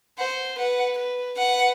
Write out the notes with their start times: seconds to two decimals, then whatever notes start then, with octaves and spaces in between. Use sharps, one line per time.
0.18 C5 F#5
0.58 B4 F#5
0.98 B4
1.38 B4 F#5